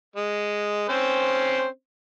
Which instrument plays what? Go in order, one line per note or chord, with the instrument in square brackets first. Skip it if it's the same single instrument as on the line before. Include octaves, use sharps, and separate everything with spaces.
[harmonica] G#3
C4 C#4 C5